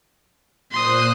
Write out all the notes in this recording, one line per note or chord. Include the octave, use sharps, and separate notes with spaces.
A#2 C5 C6 D#6 F#6